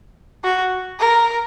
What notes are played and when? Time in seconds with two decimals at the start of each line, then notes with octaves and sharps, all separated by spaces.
0.44 F#4
1.00 A#4